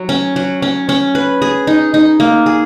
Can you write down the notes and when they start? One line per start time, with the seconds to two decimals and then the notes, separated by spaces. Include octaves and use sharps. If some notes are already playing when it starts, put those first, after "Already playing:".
Already playing: F#3
0.09 C#4
0.36 F#3
0.62 C#4
0.89 C#4
1.15 B4
1.42 G#4
1.67 D#4
1.94 D#4
2.20 A#3
2.46 G#4